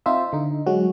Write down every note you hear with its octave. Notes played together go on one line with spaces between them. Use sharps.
C4 D#4 F4 C5 E5
D3 D#4
F#3 G#3 F#4